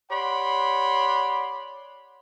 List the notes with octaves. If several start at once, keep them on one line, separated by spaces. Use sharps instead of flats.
G4 C#5 D5 F#5 B5 C6